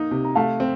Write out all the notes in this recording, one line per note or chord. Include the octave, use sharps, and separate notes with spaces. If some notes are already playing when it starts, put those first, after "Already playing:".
Already playing: A#3 D#4
C3
A#5
A3 F5 A5
C4